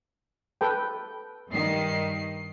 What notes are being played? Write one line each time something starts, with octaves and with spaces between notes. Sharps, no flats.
A4 B4 G5
G2 D#3 C7